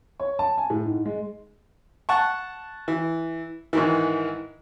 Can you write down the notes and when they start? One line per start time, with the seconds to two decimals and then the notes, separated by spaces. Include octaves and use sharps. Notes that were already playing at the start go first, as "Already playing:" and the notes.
0.20 C#5
0.39 A5
0.58 G#5
0.70 A2
0.86 G#2
1.06 G#3
2.09 F#5 A5 C#6
2.88 E3
3.73 G#2 D#3 E3